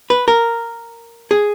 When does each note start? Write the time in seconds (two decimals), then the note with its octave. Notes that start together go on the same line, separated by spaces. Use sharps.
0.10 B4
0.28 A#4
1.31 G#4